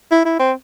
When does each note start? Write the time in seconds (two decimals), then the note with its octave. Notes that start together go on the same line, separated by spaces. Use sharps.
0.12 E4
0.25 E4
0.40 C4